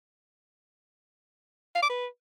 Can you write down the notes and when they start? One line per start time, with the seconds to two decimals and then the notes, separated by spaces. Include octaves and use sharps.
1.75 F5
1.82 D6
1.89 B4